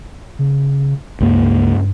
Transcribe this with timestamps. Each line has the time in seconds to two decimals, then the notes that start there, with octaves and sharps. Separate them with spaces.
0.39 C#3
1.21 C#2 G2 A#3